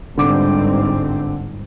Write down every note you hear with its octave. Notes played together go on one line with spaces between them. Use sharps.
G1 G#2 D3 C4 D6